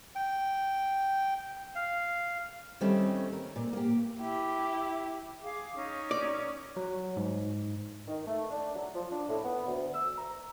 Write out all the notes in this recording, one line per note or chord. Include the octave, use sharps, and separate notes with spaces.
G5
F5
D#3 G3 A3 C4 C#4
A#4
A#2
A#3 G4
E4 G4
G#4 F5 D6
C#4 D#4
D5
F#3
G#2
D#3
A3
D4
F#3
F3
D4
A2
B3
D2
E6
A#5